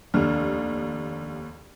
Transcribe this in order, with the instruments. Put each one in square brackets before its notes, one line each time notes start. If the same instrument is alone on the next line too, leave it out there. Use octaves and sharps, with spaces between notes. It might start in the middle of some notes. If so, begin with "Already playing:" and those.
[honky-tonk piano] F1 D#2 F6 [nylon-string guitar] D4